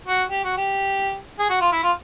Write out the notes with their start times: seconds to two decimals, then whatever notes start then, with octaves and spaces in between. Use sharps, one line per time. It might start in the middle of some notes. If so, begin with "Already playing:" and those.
0.08 F#4
0.30 G4
0.44 F#4
0.57 G4
1.39 G#4
1.50 F#4
1.61 F4
1.73 E4
1.84 F4